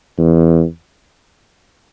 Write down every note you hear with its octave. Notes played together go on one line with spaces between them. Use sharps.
E2